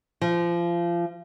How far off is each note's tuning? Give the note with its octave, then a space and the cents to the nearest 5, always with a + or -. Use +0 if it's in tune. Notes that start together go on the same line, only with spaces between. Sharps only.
F3 -25